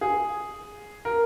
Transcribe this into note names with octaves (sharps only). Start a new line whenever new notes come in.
G#4
A#4